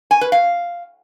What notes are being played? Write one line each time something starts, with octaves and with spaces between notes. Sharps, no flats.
G#5
B4
F5